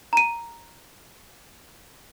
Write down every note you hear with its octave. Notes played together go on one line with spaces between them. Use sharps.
A#5 D#7